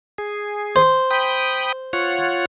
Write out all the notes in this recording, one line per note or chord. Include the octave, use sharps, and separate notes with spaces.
G#4
C5
G5 B5 D#6
F4 C#5 F#5